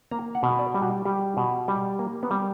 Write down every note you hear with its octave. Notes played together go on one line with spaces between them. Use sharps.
A#3 A#5
F#5
B2
D5
G3
F#4
G3 G4
B2
G3
A#3
B3
G3